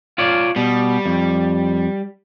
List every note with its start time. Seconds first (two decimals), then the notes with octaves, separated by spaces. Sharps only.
0.18 F4 C#5 D5
0.56 B2 G3
1.06 F2